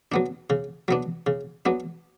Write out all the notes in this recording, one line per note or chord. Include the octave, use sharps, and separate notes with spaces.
F#3 B3 D4
C#3
F#3 B3 D4
C#3
F#3 B3 D4